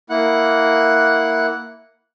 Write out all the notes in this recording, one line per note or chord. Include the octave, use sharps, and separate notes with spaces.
A#3 E4 F#5 F#6